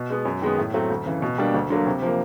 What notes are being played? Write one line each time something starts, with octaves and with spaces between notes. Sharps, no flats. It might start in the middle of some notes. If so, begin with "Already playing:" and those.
Already playing: B2
G#3 B3
F#2
D#3 G#3 B3
A2
F#3 A3 C4
D2
C#3 E3
B2
G3 A#3 D4
D2
D3 F#3 A#3
C3
F3 A#3